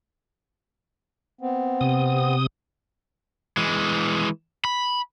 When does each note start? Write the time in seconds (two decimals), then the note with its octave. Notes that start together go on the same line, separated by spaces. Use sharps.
1.41 B3 C4
1.81 C3 D#6
3.57 E3 G#3
4.65 B5